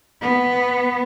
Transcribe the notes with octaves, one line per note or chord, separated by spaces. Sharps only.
B3